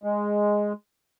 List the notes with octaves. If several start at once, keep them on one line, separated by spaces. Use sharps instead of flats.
G#3